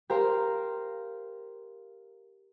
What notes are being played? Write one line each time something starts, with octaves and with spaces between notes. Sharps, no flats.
G4 A#4 C5 F5 A#5 C6